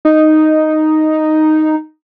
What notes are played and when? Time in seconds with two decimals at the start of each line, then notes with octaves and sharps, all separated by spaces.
0.05 D#4